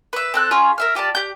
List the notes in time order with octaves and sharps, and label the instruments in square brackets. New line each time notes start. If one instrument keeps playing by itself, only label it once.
[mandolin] B4 E5
C4 A4 F#6
C#4 F4 G#4 C#5
A#4 E5 F6
F4 G4 D5 A5
G4 G6